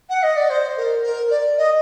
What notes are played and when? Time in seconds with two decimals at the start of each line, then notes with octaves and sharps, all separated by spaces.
0.10 F#5
0.23 D#5
0.36 D5
0.50 C5
0.77 A#4
1.03 A#4
1.30 D5
1.57 D#5